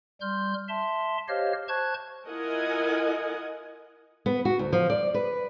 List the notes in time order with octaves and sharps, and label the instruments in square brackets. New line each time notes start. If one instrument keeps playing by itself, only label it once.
[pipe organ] G3 C6 F6 G6
E5 A5 C6
G4 C5 C#5 D#5 F5 F6
C5 A5 C#6 F#6 G#6
[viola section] E4 F4 A#4 D#5 F#5 G#5
[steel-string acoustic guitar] B3
F#4
D2
F3
D5
B4